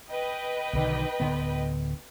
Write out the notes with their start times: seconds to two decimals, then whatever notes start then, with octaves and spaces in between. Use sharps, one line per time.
0.11 B4 D#5 G5
0.73 B1 D3 D#3
1.20 D1 D3 B3